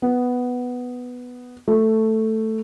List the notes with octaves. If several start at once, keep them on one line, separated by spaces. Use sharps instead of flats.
B3
A3